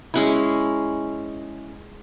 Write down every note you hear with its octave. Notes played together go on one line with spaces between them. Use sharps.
G#3 C#4 E4